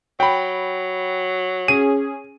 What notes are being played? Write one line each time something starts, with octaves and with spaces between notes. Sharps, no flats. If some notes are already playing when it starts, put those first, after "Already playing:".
F#3 G5 B5
C#4 G#4 D#7